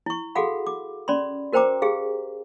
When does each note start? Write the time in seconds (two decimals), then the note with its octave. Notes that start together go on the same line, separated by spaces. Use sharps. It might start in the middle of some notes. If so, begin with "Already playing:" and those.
0.06 E4 C#6
0.35 F#4 G#4 A4 F5 F#5 B5
0.67 D6
1.08 C#4 D5 B5 C6
1.53 F#4 A#4 C5 G5 A#5 D6
1.82 G4 G#4 F5